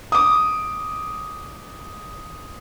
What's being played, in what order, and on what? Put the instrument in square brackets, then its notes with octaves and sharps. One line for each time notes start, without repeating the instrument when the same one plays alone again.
[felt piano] D6 D#6